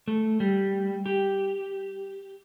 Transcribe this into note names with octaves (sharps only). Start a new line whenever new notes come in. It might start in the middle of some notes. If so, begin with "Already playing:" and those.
A3
G3
G4